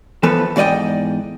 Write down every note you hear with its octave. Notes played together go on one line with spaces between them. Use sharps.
E3 F3 A3 B3 A4 B4
E2 G#2 D5 D#5 G5